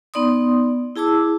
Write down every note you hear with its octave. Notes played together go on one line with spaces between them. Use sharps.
B3 D#4 D5 C6 D#6
E4 G#4 A5 D6 E6